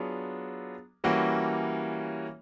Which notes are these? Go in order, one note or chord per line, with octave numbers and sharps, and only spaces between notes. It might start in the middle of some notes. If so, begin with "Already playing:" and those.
Already playing: F#3 B3 D4 F4 G#4
E3 G3 A#3 C#4 F#4